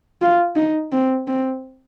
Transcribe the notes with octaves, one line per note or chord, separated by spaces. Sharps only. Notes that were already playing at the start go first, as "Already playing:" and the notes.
F4
D#4
C4
C4